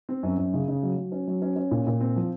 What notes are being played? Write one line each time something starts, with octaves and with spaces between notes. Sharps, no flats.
C4
F#2
F#2
C#3
C#3
F#3
F#3
C#4
F#3
C#4
C#4
A#2
A#2
C4
F3